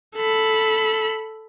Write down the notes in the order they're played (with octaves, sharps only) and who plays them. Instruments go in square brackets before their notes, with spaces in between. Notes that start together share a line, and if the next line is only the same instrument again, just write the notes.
[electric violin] A4 B5